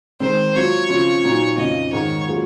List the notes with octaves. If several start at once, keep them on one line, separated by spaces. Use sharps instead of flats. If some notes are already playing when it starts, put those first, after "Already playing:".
D#3 G#3 C4 C5
F#3 C4 F4 C#5
C#3 F3 C4 F4
A#2 F#3 C4 D#4
F2 C#3 F3 D#5
G#2 D#3 G#3 C#5
F#3 A#3 C#4 F4 G#4